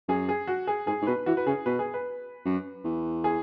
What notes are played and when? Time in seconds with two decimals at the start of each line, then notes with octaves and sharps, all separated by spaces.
0.08 F#2 G#4
0.29 G#4
0.47 F#4
0.67 G#4
0.87 G#2 G#4
1.02 G#2
1.07 B2 B4
1.26 E3 F#4
1.37 B4
1.46 C#3 G#4
1.66 B2 B4
1.79 G#4
1.94 B4
2.45 F#2
2.84 E2
3.24 G#4